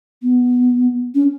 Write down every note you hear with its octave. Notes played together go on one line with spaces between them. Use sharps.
B3
C#4